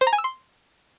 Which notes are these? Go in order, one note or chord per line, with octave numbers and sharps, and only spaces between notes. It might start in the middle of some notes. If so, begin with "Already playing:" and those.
C5
A#5
G#5
E6
C6